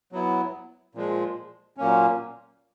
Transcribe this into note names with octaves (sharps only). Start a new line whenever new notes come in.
F#3 B3 E4
A#2 F3 G#3
A#2 F#3 A#3 C#4